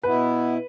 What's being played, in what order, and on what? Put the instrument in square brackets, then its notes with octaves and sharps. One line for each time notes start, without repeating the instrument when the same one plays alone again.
[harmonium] B2 B3 E4 [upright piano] B4